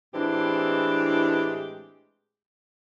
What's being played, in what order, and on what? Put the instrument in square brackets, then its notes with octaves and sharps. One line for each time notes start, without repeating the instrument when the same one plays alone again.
[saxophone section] A2 E3 G#3 C4 D4 G4